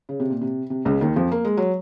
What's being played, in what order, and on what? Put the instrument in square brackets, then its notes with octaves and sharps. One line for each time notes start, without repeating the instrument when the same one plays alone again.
[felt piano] C#3
C3
A#2
C3
C3
C#2 C#3
D#2 D#3
F2 F3
A#3
G#3
F#3